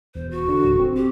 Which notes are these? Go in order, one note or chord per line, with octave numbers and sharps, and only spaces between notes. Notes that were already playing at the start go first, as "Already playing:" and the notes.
E1 C5
F#4
D3
D1
C4
G4